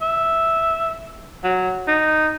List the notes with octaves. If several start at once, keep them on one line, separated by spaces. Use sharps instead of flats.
E5
F#3
D#4